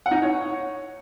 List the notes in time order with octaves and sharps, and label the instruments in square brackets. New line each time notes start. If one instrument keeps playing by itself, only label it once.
[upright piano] F#5
D#4
F#5
C#5